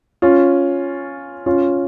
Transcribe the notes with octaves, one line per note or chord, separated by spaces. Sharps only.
C#4 F4
C#4 F4